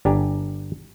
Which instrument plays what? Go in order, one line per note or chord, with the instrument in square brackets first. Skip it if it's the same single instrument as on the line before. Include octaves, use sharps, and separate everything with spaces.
[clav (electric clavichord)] G1 D4 G4 G#5 A#5